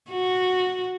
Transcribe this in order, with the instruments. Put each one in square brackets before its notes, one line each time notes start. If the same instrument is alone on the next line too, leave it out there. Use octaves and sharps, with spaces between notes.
[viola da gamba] F#4